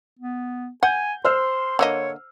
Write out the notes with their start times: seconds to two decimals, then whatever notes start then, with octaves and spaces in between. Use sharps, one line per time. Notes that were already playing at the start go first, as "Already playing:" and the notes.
0.19 B3
0.83 F#5 G#5 G6
1.25 C5 C6 E6 F6
1.79 D3 A#3 C#5 D#5